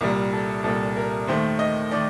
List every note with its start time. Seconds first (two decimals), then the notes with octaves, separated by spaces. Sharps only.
0.01 C2 A#2 G3 A#4
0.33 A4
0.64 C2 A#2 G3 A4
0.96 A#4
1.27 D#2 D#3 A3 C5
1.59 D#5
1.92 D#3 A3 D5